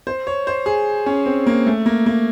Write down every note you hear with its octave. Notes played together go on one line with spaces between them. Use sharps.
C5
C#5
C5
G#4
C#4
C4
A#3
A3
A#3
A#3